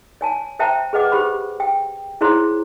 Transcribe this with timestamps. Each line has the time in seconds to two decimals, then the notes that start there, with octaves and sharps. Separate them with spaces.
0.21 C#5 G#5 A5
0.59 C5 E5 G5 A5 A#5
0.93 G#4 B4 D#5 F#5 D6
1.12 G4 C5 B5
1.60 G5
2.21 E4 G#4 C5 C#5 A#5 C6